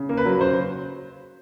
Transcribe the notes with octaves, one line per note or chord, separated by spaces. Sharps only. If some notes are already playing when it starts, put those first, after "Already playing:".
Already playing: C#3
A#3
B4
F#3
C#3 C5